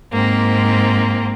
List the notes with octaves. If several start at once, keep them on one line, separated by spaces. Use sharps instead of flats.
G#2 A#3 C4